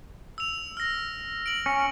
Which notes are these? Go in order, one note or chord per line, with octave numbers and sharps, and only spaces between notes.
E6 F7
F6 A#6
D7 F#7
C#4